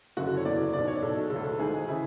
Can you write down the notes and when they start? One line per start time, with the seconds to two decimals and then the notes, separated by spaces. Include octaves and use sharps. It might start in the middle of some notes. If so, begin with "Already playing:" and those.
0.17 F#1 F#2 D3 F#4
0.27 A4
0.37 C#5
0.45 F#1 E2 B2 D5
0.73 B1 B2 D5
0.88 C#5
1.02 B1 B2 A4
1.30 D3 A4
1.36 D2
1.59 G#1 G#2 E3 G#4
1.88 C#3 E3 E4